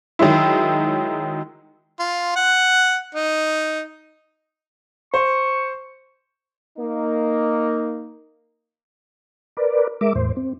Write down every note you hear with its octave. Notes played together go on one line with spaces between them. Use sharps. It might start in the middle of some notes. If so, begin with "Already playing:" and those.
D#3 F#3 G#3 E4
F4
F#5
D#4
C5 C#6
A#3 D#4
A#4 B4 D5
G#3 A#4 E5 D6
E2 A2 C5
C4